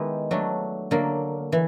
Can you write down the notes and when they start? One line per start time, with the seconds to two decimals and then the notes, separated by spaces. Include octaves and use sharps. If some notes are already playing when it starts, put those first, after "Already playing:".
Already playing: D#3 G#3 B3 E4 G4
0.31 F#3 A3 D4
0.91 D3 F#3 A#3
1.52 E3